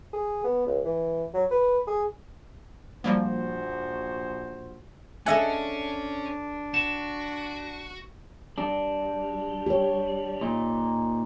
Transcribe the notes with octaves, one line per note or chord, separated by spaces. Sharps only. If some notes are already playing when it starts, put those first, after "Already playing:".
G#4
B3
C#2
E3
F#3
B4
G#4
A#1 F3 G3 A#3 F#4 C5
C#4 D4 A4 D#5 E5 F#5 G#5
F#4 E7
G3 D4
G4 C#5
A#2 D#4